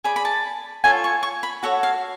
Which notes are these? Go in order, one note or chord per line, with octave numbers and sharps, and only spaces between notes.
G#4 D5 B5
B5
A5
F4 A4 C#5 G#5
C#6
C#6
B5
F#4 A4 C#5 F#5
F5